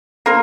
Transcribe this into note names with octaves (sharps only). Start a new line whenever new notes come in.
A#3 F4 A#4